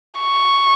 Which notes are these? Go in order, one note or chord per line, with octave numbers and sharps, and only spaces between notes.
C#6